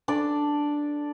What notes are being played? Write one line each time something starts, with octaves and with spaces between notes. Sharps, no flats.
D4 A4 D5